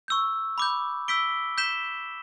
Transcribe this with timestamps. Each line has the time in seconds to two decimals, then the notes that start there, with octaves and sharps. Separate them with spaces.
0.08 C#6 E6 G6
0.58 B5 D6 G6
1.08 E6 G6 B6 D7 G7
1.58 G6 B6 E7 G7